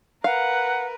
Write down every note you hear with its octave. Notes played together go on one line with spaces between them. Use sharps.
A#4 B4 F5 F#5